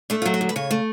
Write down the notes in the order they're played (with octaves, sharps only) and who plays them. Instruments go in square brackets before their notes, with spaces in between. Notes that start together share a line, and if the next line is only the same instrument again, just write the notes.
[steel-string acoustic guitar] A3 D4
F4
F#3
F#4
D2
B4
C#3 C#5
A3